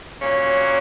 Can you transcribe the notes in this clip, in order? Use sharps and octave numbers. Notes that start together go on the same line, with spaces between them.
A#2 F#3 A#3 C#4